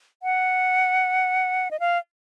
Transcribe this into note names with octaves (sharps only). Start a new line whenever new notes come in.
F#5
D#5
F5